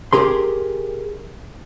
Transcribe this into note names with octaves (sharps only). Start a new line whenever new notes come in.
G4 G#4 A#4 C6